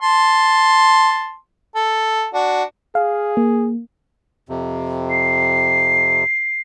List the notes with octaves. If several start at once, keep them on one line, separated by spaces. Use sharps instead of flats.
A5 C6
A4
D4 F#4
G#4 F5
A#3
F2 C3
C7